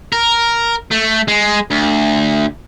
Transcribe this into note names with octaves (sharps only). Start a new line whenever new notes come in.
A#4
A3
G#3
D2